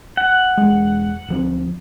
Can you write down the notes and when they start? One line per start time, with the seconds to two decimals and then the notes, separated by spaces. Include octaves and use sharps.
0.17 F#5
0.57 E1 G#3
1.28 D1 F3 C4